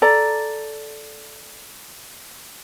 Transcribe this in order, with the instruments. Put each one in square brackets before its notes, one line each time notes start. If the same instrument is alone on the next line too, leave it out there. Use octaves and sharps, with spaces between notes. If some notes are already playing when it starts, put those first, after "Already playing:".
[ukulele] A4 D5 A#5